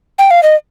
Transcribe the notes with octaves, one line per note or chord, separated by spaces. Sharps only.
G5
F5
D#5